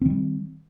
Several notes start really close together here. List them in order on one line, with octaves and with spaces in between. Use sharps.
C4 D#3 G3